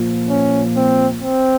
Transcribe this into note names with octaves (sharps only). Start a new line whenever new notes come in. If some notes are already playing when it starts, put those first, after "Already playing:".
Already playing: A#2 F3
C#4
C4
C4